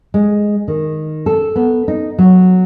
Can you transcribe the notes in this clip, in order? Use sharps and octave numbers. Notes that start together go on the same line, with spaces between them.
G#3
D#3
A4
B3
D#4
F#3